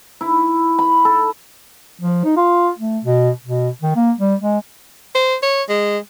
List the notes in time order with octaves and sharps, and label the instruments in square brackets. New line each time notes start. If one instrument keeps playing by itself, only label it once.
[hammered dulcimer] E4
B5
A4
[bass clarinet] F3
D#4
F4
A3
B2
B2
D#3
A#3
G3
G#3
[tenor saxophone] C5
C#5
G#3